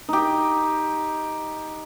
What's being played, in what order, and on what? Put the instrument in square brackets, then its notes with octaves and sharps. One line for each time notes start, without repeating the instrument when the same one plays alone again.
[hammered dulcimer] D#4 G4